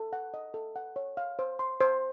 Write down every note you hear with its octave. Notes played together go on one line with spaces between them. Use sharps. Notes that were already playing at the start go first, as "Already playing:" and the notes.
Already playing: A4
F#5
D#5
A4
F#5
C#5
F5
C5
C6
C5